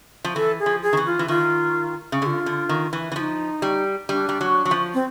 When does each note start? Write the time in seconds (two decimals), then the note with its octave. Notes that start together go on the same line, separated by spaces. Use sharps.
0.24 F3
0.36 E3 A4
0.59 G#4
0.66 F3
0.83 G#4
0.93 D#3
0.97 E3
1.06 F4
1.19 E3
1.28 D#3 F4
2.12 C#3
2.22 D3 G#4
2.27 F4
2.46 D3
2.69 D#3
2.93 E3
3.12 E3
3.16 F3 F4
3.20 D#4
3.62 G3
4.09 G3 D4
4.29 G3
4.41 F#3
4.65 F#3
4.71 F3
4.94 C4